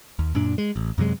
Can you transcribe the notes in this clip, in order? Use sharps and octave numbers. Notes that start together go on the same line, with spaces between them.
D#2
F#2 A#2 D4
G#3
A1
F#2 C3 F#3 G#3